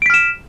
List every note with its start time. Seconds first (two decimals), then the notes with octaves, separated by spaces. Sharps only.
0.02 D7
0.06 B6
0.10 F6
0.14 E7